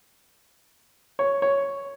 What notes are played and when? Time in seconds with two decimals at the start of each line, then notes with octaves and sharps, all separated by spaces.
1.19 C#5
1.42 C#5